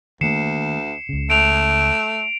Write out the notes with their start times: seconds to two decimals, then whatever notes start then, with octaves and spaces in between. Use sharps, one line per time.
0.21 D2 D#3 A3 A#3 C7 C#7 E7
1.09 C#2 C#3
1.30 A3 D7 F7